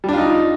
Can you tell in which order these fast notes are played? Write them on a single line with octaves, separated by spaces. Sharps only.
G3 D4 F4 D#4